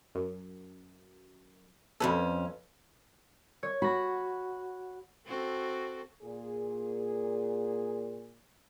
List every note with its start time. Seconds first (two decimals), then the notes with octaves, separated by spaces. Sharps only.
0.15 F#2
2.00 F2 G#2 C#4 A4 B4
3.63 C#5
3.82 F#4 B5 A#6
5.26 C4 F#4 A4
6.23 A#2 G#4